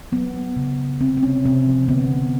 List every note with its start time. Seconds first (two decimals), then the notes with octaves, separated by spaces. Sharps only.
0.12 F#3 B3
0.34 F#3
0.56 C#3
0.79 C#3
1.00 C3 C4
1.17 C4
1.22 C3 C#4
1.45 C3 C4
1.66 F3
1.88 D3 B3
2.11 D3